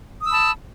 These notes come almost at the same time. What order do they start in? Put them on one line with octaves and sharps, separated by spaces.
D#6 E6 B5 A5